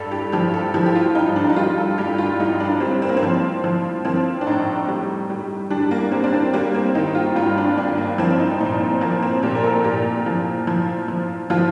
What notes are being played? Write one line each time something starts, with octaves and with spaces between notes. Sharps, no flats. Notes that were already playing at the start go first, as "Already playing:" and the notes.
Already playing: G2 A4
G4
F3 G4
A4
F3 G4
G4
F4
G2 D#4
D4
D#4
G3 F4
A4
G2 G4
F4
G2 D#4
D4
G3 C4
C4
A#3
C4
F3
F3
F3 C4
D4
A2 D#4
G3
G3
G3 D4
A#3
G3 C4
D4
C4
G3 A#3
C4
D#3 D#4
F4
G2 F4
D4
G2 D4
A#3
F3 C4
D#4
A#2 D#4
C4
F3 A#3
C4
A#2 G4
A#4
A4
A#2 G4
F3
F3
F3
F3 F4